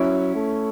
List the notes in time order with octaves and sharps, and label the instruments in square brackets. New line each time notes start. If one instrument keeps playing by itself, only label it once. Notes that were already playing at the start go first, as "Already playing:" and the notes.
Already playing: [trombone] F#3 [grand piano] C#4 E4
[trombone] A3